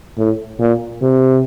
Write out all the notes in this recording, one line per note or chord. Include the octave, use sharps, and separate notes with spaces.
A2
A#2
C3